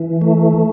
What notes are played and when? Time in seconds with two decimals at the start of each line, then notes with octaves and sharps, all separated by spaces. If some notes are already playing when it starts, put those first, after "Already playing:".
Already playing: E3
0.21 A3